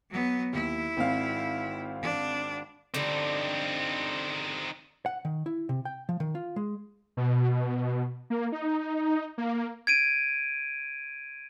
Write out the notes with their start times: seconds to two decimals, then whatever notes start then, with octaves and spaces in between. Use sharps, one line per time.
0.11 F#3 B3
0.53 D#2 E4
0.97 G#1 C4 F5
2.02 D4
2.94 D3 F3 G3 C4 D#4
5.06 F#5
5.25 D#3
5.46 E4
5.69 C3
5.85 G5
6.09 F3
6.20 D#3
6.35 F4
6.56 G#3
7.17 B2
8.30 A#3
8.52 D#4
9.38 A#3
9.87 G#6 D7 D#7